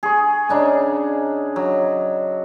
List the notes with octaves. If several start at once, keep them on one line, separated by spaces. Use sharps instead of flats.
G#4 C#6
C#3 D4 D#4
F#3